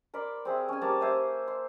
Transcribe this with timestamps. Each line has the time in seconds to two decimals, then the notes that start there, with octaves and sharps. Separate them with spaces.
0.14 A#4 D5 B5 C6
0.45 C4 G#4 E5
0.69 C#4 G#5
0.81 G3 A#3 A5
1.01 C5 C#5 E5 G#5
1.48 C6